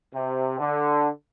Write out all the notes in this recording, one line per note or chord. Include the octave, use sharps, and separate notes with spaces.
C3
D3